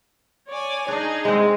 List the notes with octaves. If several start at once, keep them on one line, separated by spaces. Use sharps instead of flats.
C#5 D5 G#5
D4 D#4 G#4
G#3 C4